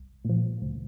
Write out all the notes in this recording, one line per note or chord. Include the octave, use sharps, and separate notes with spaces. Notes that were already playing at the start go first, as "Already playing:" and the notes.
Already playing: C2
A#2 F3
D2